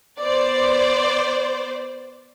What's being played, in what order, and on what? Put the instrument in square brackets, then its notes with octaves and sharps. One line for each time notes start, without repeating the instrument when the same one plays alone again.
[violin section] B3 C5 D5